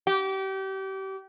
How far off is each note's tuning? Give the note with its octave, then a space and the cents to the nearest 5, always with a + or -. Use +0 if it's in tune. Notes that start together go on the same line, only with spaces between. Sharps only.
G4 -30